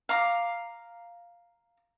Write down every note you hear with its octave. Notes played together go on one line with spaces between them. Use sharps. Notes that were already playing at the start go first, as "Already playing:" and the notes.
F5 A#5 D6